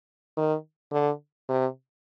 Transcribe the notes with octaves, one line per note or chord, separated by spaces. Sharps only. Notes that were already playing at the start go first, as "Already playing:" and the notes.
D#3
D3
C3